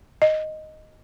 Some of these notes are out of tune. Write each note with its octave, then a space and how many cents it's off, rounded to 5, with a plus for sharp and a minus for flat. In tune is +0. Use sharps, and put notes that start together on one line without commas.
D#5 +0